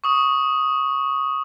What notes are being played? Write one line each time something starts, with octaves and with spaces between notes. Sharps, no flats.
C#6 D#6